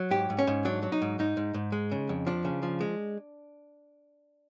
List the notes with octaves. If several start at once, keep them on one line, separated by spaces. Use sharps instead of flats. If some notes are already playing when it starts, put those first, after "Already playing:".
Already playing: F#3
G#2 G4
G#2
C#4
G#2
F#3 D4
F#3
D#4
G#2
G#2 D#4
G#2
G#2
G#3
C#3
F2
F3 D4
C#3
F3
G#3